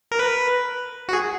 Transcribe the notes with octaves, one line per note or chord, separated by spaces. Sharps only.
A#4
B4
F#4
G#4